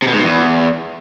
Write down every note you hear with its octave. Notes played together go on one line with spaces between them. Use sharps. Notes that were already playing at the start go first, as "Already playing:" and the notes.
C3
B2
G#2
B2
E2